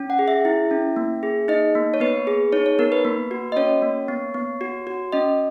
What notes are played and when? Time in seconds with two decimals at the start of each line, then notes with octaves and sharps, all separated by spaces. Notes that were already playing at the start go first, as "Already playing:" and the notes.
Already playing: C#4
0.10 F#5
0.19 G#4
0.28 E5
0.45 E4
0.71 C#4
0.96 A#3
1.23 G#4
1.48 D#4 D#5
1.75 A#3
1.94 C#5
2.00 B3 B4
2.27 G#4
2.52 D#4 C#5
2.66 C#5
2.79 B3 A#4
2.92 B4
3.05 A#3
3.31 F#4
3.52 D#5
3.56 C#4 C#5
3.82 A#3
4.08 B3
4.34 B3
4.61 F#4
4.87 F#4
5.12 C#4 D#5